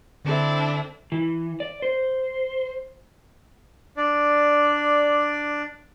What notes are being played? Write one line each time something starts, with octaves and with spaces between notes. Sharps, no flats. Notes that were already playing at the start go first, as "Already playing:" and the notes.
D3 C4 D4 E4 A4
E3
D5
C5
D4 D5